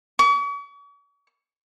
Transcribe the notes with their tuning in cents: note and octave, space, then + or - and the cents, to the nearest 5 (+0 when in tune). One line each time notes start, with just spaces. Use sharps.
C#6 +45